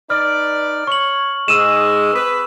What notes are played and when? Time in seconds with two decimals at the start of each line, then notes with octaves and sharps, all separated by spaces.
0.10 D#4 B4 D5 F6
0.87 C#5 C#6 F#7
1.48 G#2 G#3 E6 D#7 E7
2.13 C4 G#4 B4